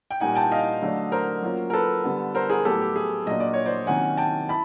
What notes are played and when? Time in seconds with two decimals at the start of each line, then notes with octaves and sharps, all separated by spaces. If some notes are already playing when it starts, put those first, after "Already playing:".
0.11 G5
0.20 A#2 G3 A#3 D#4 F#5 G#5
0.35 G5 A5
0.52 D#5 F5
0.82 D3 F#3 A3 D4
1.12 A#4 C5
1.42 F#3 A#3 C#4 F4
1.70 A#4
1.73 A4 B4
2.04 D3 G3 B3
2.35 A#4 C5
2.50 G#4 A#4
2.65 A2 F#3 B3 G4 A4
2.81 G4
2.96 G#4
3.26 A#2 F#3 A#3 D4 D#5
3.40 D5
3.53 C#5
3.66 C5 D5
3.87 C3 D#3 F#3 A#3 C#4 F#5 G#5
4.17 G5 A5
4.48 E4 A5 B5